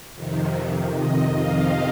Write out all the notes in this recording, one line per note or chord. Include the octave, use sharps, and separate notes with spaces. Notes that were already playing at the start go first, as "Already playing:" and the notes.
F2 C3 D#3
D#5
F5